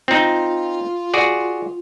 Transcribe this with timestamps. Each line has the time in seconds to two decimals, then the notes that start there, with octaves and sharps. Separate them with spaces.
0.08 C4 D#4 F4
1.14 F#4 G#4 D5